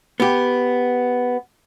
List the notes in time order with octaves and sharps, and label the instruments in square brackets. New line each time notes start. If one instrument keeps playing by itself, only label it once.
[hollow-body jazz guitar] B3 G4